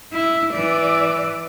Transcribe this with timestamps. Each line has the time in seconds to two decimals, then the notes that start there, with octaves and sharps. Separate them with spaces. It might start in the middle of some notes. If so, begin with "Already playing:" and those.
0.13 E4
0.53 E3 D5